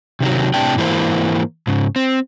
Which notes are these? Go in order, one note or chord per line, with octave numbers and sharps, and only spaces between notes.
C3 D#3 F#3
A2 C3 D4 G5
G#2 E3 A#3 C5
G#2 C#3
C4